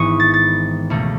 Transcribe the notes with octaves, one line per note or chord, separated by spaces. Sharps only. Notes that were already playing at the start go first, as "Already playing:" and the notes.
Already playing: G#1 G#2 E3 B3 C#6 D#6
A6
A6
C#2 B2 A3